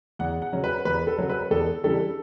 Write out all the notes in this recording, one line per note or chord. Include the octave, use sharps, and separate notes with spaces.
E2 F#5
F#5
C#3 F#3 C#4
B4
E2 B4
A4
C#3 F#3 C#4
B4
E2 A4
C#3 E3 G3 D4 A4